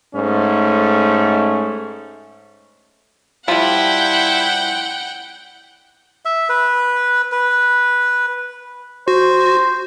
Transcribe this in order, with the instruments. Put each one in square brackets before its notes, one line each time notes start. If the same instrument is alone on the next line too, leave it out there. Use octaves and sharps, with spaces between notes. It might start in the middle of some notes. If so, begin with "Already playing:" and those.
[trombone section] G#2 A3 C#4
[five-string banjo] F3 G3 [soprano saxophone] E4 [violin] F#5 G5
[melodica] E5
B4
B4
[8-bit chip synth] F#4 [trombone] C5